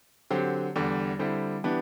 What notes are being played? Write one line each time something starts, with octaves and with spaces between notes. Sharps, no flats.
D3 F#3 C4 G4
E2 D3 G3
D3 G3 C4 E4 G4
E3 B3 D4 G4